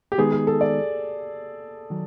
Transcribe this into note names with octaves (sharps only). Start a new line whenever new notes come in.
G4
D#3 G#3 B3 D#4 G#4
G#4
A4
D5
D#3 F#3